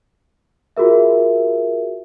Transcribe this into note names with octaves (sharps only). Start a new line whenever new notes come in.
F4 F#4 G#4 A#4 E5